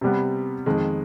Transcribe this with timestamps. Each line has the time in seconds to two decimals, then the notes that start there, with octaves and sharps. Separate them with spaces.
0.01 C3 G3 B3
0.66 F2 D#3 G#3